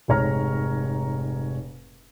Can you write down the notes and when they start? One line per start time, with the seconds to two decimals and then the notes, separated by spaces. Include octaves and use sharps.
0.08 F1 G#2 C#5 A#5 F6